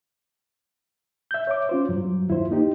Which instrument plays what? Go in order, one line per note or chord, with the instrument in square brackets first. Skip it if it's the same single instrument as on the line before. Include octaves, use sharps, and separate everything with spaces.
[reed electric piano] E5 G6
C#5 E5 D6
C#4 F4 C5
G2 F#3
D#2 E4 F4 C5
A#3 D#4 G4